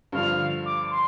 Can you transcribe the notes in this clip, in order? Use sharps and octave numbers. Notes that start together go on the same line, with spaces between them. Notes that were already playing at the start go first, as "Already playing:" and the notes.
G2 D3 F3 F5
D6
C6